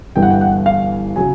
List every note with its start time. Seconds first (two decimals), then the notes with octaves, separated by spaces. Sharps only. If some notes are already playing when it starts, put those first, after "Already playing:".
0.16 G1 G2 E3 G3 G5
0.23 F#5
0.30 G5
0.41 F#5
0.66 F5
1.16 C#3 F#3 G#5